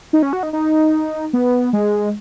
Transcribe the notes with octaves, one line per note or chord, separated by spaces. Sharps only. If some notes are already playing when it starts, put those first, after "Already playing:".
D#4
C#4
F#4
D#4
D#4
B3
G#3